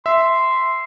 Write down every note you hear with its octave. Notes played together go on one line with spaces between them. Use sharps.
E5 C6 E6